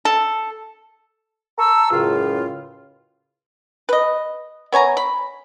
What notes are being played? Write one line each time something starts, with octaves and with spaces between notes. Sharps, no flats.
A4
A5 A#5 C#6 E6
C#2 F#2 A2 C#3 F4
B4 D#5
B3 C#5 G#5 A#5
B5